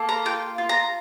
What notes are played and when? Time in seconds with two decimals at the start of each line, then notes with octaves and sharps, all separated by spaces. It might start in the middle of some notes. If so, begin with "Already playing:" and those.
Already playing: A#3 A4
0.09 A#5
0.25 F4 G5
0.58 F4
0.69 A#5